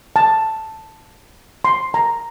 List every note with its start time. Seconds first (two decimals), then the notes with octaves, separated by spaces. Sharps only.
0.16 A5
1.65 C6
1.94 A#5